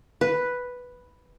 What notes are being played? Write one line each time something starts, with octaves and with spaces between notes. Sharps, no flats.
B4